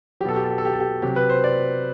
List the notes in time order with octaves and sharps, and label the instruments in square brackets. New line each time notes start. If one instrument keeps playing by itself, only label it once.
[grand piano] F#3 G4
B2 A4
G4
A4
G4
A4
G4
A4
G4
C3 F#3 G4
B4
C5
D5